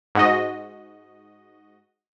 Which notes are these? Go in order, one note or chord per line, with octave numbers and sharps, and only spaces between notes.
G#2 F#4 D#5